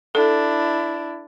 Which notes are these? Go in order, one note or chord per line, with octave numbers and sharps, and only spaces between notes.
D4 E4 A4